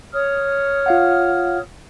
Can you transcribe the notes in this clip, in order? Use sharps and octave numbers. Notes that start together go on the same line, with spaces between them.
C#5 D#6 F6
F4 F5 F#5